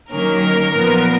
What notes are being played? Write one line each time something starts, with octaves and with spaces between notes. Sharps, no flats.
D#3 F#3 A#3 C#4 A#4
A#2 F3 B3